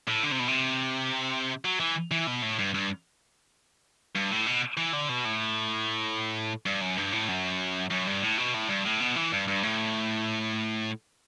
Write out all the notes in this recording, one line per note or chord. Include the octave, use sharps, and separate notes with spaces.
A2
D3
C3
B2
C3
F#3
E3
E3
B2
A2
G2
G2
G2
A2
B2
E3
D3
B2
A2
G2
F#2
G2
A2
F#2
F#2
G2
A2
B2
A2
G2
A2
B2
E3
G2
G2
A2